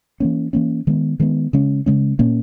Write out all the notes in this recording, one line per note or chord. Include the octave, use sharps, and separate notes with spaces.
E3 A#3 C#4
E3 A#3 C#4
D#3 G#3 B3
D#3 G#3 B3
C#3 G#3 C#4
C#3 G#3 C#4
A#2 A#3 C#4